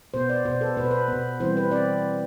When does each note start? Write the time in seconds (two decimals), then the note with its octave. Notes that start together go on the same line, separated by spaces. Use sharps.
0.14 B2 B3 C5
0.29 D5
0.45 B2 B3 C5
0.61 A4
0.77 B2 B3 B4
0.84 C5
0.91 B4
1.08 B2 B3
1.40 E3 G3 C4 C5
1.57 B4
1.72 C4 D5